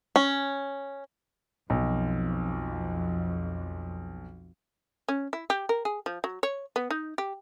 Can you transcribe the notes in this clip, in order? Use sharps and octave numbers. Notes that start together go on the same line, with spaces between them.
C#4
B1 F2
C#4
E4
G4
A#4
G#4
F3
F#3
C#5
B3
D#4
G4